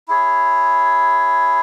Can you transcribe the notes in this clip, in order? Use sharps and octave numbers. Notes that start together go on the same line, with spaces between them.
E4 G#4 C#5